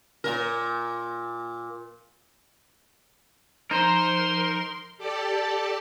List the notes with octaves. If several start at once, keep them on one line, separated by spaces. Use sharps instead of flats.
A#2 A#4
F3 D#4 A#4 C5 C6
G4 A4 D5 A5